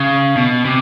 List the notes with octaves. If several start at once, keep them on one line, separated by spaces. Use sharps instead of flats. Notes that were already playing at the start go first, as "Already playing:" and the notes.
Already playing: C#3
B2
C3